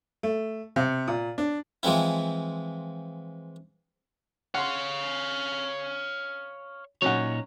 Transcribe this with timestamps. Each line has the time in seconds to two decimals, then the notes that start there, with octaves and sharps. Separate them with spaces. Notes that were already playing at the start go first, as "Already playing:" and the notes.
0.23 A3
0.76 C3
1.08 A#2
1.38 D4
1.83 E3 F3 G#3 C4 E4
4.54 C#5 F5 F#5 C6
7.02 A#2 F#3 C#4 D#4 C#5 F#5